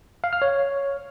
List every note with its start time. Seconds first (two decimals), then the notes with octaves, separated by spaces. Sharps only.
0.24 F5
0.33 F6
0.42 C#5